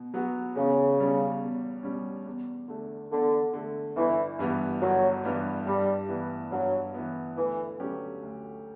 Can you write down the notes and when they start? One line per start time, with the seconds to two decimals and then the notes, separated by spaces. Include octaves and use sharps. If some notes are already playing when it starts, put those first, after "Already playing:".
Already playing: B2
0.14 F#3 B3 F#4
0.56 E2 C#3
0.98 B2 G3 C#4
1.41 E2
1.83 B2 G3 C#4
2.26 E2
2.68 D3 A3
3.11 E2 D3
3.54 D3 A3
3.96 G1 E3
4.39 G2 E3 G3 B3
4.81 G1 F#3
5.24 G2 E3 G3 B3
5.67 G2 G3
6.09 E3 B3
6.52 G2 F#3
6.94 E3 B3
7.37 D2 E3
7.80 D3 F#3 C#4 G4
8.23 D2